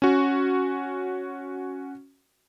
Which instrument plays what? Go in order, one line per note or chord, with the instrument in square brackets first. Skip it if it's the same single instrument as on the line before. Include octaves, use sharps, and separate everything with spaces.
[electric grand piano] C#4 F#4